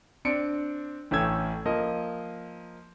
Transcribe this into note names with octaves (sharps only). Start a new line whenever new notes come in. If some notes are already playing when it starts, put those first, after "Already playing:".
C4 D4 C#7 D7
A1 A3 C#4 G5 E6 G#6
F3 A#3 D#5